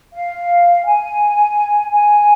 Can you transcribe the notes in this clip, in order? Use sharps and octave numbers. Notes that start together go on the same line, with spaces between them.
F5
G#5
G#5